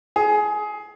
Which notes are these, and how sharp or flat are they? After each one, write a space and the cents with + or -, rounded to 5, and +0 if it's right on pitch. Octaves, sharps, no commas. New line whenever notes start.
G#4 +20